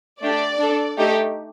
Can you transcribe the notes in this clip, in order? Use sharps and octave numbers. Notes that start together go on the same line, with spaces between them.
A3 D4 G4 D5
D4 A4
A3 D#4 G4